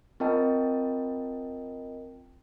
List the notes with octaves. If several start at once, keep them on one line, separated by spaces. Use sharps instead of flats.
C4 F4 A#4 D#5 G5 A5